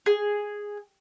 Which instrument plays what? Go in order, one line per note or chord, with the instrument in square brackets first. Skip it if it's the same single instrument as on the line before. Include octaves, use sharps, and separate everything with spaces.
[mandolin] G#4